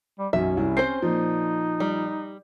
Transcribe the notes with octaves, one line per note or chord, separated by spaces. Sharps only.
G3
B1 F#2 C#4 E5
C2 E4
C4 C5 G6 C7
A#2 F3 D#4
G3